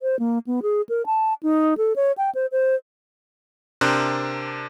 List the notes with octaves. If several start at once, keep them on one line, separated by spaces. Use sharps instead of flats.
C5
A#3
B3
G#4
A#4
A5
D#4
A4
C#5
G5
C5
C5
C3 D4 A#4 C5 F#6